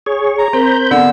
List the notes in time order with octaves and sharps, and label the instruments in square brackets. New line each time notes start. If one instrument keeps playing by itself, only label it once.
[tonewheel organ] G#4 C#5 C#6
[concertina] A#5
[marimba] C4 A#4 [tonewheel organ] C5 B5 G6
[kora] D3 [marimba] B3 [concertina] E6